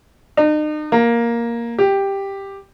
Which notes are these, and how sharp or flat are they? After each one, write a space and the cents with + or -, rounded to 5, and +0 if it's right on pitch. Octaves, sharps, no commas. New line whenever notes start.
D#4 -40
A#3 +5
G4 +5